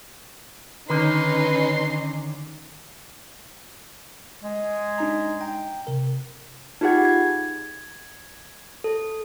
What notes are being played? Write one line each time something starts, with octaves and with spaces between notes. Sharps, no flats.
D3 D#3 C#4 D#4 B4 C6
G#3
D4 D#4 A#5
G5 A#5
C3 A#4
D#4 F4 G4 G#4 F#5 G#6
G#6
A4